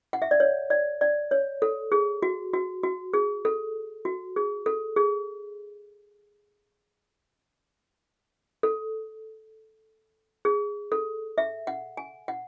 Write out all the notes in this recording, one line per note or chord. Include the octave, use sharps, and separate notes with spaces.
F#5
E5
D5
C#5
D5
D5
C#5
A4
G#4
F#4
F#4
F#4
G#4
A4
F#4
G#4
A4
G#4
A4
G#4
A4
E5
F#5
G#5
F#5